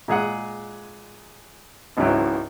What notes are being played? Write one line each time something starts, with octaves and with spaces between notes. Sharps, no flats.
A#2 G#3 G#4 F#5
G#1 C#2 E3 F#3 E4